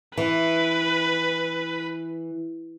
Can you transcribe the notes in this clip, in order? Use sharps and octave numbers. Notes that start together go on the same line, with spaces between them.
E3 B4